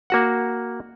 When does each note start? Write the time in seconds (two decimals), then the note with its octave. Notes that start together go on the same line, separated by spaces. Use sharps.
0.10 A#3 F#4 F#5